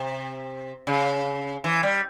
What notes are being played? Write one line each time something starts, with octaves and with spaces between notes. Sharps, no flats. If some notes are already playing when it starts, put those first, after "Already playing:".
Already playing: C3
C#3
E3
G3